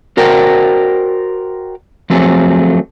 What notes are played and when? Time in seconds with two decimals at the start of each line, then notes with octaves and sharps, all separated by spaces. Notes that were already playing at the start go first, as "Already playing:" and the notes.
0.17 F#4 A#4 C5 D5 G5
2.10 F3 F#3 A3 C4 G#4 A4